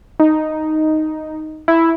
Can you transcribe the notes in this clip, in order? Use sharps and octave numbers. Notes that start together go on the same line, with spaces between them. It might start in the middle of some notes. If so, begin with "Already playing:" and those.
D#4
E4